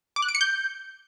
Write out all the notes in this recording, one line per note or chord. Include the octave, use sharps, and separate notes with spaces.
D6
F#6
D7
C#7
G6